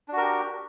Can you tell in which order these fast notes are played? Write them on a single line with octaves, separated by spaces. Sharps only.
D4 F#4 A#4 G4